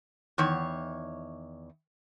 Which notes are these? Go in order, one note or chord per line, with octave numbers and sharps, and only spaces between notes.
E2 D#3 C#5